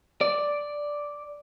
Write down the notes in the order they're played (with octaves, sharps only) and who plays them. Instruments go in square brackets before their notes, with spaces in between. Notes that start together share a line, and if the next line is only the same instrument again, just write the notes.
[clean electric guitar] D5